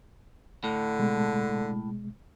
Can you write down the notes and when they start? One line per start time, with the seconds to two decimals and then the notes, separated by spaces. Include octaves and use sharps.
0.64 A2 D3
0.99 B2 G#3